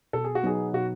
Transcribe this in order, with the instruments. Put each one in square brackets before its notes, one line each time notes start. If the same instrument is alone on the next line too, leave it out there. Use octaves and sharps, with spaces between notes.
[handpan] B2 [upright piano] A4
[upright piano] G#4
F#4
[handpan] F#3 B3 D#4 [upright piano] G#4
[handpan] B2 [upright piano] F#4